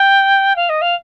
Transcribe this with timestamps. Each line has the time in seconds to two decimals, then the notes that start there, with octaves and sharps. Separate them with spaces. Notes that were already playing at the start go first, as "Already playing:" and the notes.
Already playing: G5
0.56 F5
0.69 D#5
0.81 F5